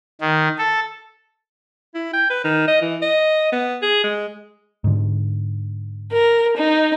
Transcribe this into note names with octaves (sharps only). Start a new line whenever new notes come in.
D#3
A4
E4
G5
B4
D#3
D#5
E3
D#5
B3
G#4
G#3
G#2 D3
A#4
D#4